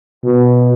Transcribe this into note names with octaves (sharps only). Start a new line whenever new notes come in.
B2